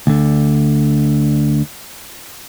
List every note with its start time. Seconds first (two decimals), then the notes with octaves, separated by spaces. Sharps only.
0.07 D2 D3